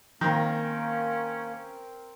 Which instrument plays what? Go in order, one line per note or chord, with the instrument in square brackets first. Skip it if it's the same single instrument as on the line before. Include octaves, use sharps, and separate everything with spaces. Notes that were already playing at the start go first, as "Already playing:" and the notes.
[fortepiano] D#3 [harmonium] A#3 [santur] C4 A#4 [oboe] C#4